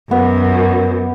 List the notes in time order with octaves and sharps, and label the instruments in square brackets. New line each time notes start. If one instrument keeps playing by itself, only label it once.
[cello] F#2 [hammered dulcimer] B3